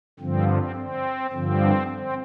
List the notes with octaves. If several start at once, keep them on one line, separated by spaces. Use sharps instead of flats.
G2 D3 F3 C4
C4
C4
G2 D3 F3 C4
C4